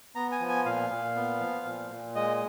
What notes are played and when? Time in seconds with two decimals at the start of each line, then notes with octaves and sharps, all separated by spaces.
0.15 B3 A#5
0.32 G#5
0.40 F3
0.49 G#5
0.66 A#2 F5
0.90 A#2
1.16 B3
1.40 F3
1.65 A#2
1.90 A#2
2.15 G#3 D#5